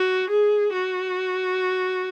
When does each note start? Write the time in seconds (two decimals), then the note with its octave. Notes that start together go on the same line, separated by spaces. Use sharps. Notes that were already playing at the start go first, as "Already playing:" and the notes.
Already playing: F#4
0.30 G#4
0.72 F#4